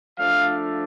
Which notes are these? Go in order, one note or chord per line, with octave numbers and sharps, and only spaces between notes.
F3 A3 D4 F5